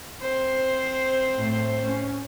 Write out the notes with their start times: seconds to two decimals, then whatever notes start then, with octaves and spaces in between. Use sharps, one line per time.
0.22 C4 C5
1.37 A2 A3
1.86 C#4